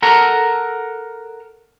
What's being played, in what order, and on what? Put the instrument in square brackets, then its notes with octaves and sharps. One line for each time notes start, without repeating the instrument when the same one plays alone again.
[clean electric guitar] A4 A#4 F#5 A#5